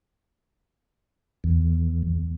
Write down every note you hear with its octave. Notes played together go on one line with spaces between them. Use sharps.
E2